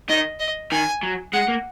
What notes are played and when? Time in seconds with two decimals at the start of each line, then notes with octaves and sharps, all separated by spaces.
0.09 D#3 D#5
0.40 D#5
0.71 D#3 G#5
1.03 F#3
1.33 G#3 F#5
1.48 A#3